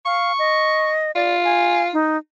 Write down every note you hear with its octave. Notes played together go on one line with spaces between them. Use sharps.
F5 C#6
D#5
F4 D5
G#5
D#4